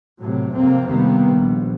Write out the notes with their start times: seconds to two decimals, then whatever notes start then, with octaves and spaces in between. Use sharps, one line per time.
0.20 A2 C3 F#3
0.55 F2 C3 A#3 C4
0.88 C3 D#3 G3 A#3 B3
1.35 A#1